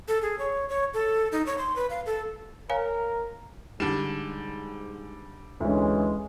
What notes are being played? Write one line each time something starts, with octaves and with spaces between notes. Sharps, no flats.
A4
G#4
C#5
C#5
A4
D#4
C#5
C6
B4
F5
A4
A#4 C#5 F5 G#5
G#2 D3 G3 E7
D2 E3 G#3 C#4